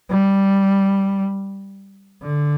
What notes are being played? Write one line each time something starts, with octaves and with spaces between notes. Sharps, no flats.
G3
D3